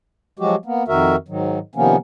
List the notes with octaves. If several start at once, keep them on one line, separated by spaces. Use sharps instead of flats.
F3 F#3 G#3 F#4 G4
A#3 B3
F2 D#3 F#4 A#4 E5
G#2 D#3 F#3
C3 D#3 F3 A#3 B3 C#4